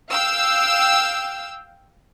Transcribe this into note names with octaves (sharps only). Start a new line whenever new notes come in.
F5 G5 E6